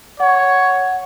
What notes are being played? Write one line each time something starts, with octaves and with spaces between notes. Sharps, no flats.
C#5 F#5